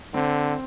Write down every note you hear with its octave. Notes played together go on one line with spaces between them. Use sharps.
D3 C4